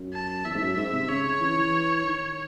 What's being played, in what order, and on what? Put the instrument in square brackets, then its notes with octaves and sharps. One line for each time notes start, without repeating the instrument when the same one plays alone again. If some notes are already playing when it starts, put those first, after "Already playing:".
Already playing: [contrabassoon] F#2
[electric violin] A5
[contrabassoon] E2 [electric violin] E5
[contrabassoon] G#2
F#2
G#2
C3
[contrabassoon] C#3 [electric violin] C#5
[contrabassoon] E3
E3
D#3